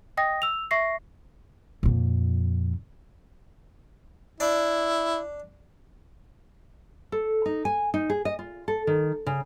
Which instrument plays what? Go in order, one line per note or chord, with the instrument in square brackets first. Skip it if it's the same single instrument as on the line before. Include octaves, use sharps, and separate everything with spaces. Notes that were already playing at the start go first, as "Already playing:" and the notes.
[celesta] D#5 G5 D#6 A#6
E6 F7
E5 C#6 A#6 C7
[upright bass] F2 A#2
[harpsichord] D4 D5 [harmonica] E4
[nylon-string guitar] A4
D#4
G#5
D#4
G#4
D#5
F4
A4
D#3
C#3